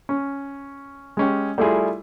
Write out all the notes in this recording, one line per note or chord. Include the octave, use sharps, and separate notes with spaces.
C#4
G#3 C#4 G4
G3 A3 E4 F4 G#4